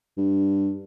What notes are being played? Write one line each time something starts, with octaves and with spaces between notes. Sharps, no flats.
G2